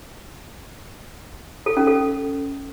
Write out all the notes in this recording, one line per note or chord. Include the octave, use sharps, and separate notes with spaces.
A4
C#4
A4